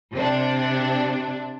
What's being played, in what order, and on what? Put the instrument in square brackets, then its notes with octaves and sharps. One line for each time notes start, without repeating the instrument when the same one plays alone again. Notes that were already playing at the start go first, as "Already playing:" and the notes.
[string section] C3 D4